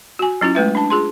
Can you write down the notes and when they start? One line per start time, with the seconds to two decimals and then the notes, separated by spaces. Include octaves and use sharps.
0.19 F#4 G#5
0.41 F#3 C#4 E4 F4
0.55 G#3 A3 B4 E5
0.75 D4 A5
0.90 F4 G#4 C6